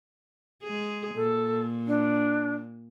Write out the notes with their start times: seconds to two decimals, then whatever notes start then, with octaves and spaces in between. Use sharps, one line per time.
0.63 G#3 G#4
1.15 A#2 A4
1.87 D4